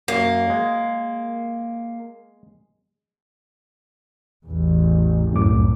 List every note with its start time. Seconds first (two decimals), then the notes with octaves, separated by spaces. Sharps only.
0.08 F#2 A#3
0.50 G#3
4.46 A1 E2
5.33 F1 C2 F#2 A2 D6